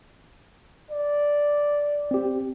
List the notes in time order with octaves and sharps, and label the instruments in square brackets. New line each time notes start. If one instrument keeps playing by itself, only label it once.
[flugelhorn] D5
[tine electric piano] C4 G4